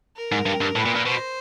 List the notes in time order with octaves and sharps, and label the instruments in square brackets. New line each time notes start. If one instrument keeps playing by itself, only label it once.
[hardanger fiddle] A#4
[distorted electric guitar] G#2
G2
G2
[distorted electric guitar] A2 [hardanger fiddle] B4
[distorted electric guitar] A#2
A#2
[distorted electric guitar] B2 [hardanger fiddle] C5